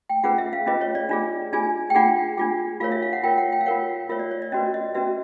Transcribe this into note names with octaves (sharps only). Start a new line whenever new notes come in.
G5
C#4 F4 G#4 B4 F#5
E5
F5
C#4 F4 G#4 B4 D#5
C#5
D5
D4 F4 G#4
D4 F4 G#4 G#5
G5
D4 F4 G#4 F#5
D4 F4 G#4
F4 A#4 C#5 F5
E5
F5
F#5
F4 A#4 C#5 G5
F#5
G5
F5
F4 A#4 C#5 F#5
F4 A#4 C#5 E5
D5
C#5
D5
C#4 F#4 B4 D#5
D#5
C#4 F#4 B4 E5